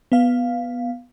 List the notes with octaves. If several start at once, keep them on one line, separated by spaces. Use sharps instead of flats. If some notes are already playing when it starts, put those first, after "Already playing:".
B3 F5